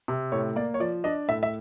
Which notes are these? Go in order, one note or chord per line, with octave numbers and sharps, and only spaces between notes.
C3
A2 C#5
A#3 D5
C#5
F3 D5
D4 D#5
A2 E5
E5